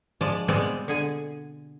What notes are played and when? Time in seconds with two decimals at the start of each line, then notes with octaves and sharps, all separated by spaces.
0.21 F3 G#3 D5 A5
0.48 B2 G3 G#3 B3 C4 D5
0.88 D3 G#4 G#5